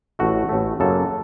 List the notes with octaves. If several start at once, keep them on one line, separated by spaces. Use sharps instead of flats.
A1 A2 A3 F#4
A1 A2 A3
F#2 C#3 F#3 A#3 A4